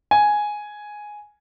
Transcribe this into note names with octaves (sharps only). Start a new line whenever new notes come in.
G#5